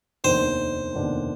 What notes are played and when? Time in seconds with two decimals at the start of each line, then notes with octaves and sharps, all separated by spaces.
0.24 F1 D#2 D#3 B3 D4 C5
0.95 F1 D#2 D#3 B3 D4